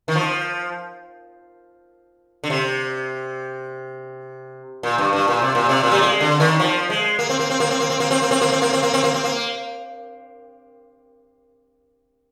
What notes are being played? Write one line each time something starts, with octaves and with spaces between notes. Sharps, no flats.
D#3
F3
D3
C3
A#2
G2
G2
A#2
C3
A#2
C3
A#2
G3
G#3
D3
D#3
F3
G#3
A#3
C4
A#3
C4
A#3
C4
A#3
C4
A#3
C4
A#3
C4
A#3
C4
A#3
C4
A#3
C4
A#3
C4
A#3